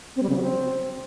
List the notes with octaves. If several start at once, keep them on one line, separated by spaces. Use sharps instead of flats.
C4
G3
C#3
F#3
C4